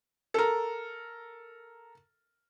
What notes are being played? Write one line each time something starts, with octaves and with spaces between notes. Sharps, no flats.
A4 A#4